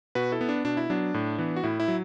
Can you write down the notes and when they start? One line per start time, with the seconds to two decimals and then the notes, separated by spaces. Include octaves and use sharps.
0.15 B2 F#4 B4
0.32 E4 A4
0.41 B3
0.49 D4
0.65 B2 D4
0.77 E4
0.90 F#3 B3 D4
1.14 A2
1.38 E3 B3
1.56 F#4
1.64 A2 E4
1.80 E4
1.88 F#3